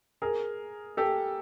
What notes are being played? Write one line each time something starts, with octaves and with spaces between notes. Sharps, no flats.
G#4 A#4
G4 A4